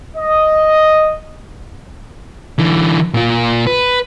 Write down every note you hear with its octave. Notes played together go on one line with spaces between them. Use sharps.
D#5
D3 E3
A#2 F4
B4